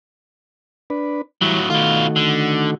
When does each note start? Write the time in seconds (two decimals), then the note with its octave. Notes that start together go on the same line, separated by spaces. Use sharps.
0.90 D4 B4
1.41 A2 E3 F#3 G3
1.70 B2 D#3 A3 F4 F#4
2.16 D3